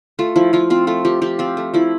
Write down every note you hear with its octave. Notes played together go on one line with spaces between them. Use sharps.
A3 F4
F3 E4
F3 F4
C4 F4
A3 F4
F3 G4
F3 G4
C4 F4
A3
F3 E4